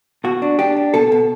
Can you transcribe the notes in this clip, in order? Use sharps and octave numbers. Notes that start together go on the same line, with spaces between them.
B2 F#4
D4
D4 G4
D4
B2 A4
B2